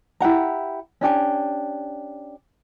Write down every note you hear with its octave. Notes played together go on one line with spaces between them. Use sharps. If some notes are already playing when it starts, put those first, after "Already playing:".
E4 G4 F#5 A#5
C#4 D4 G4 G#5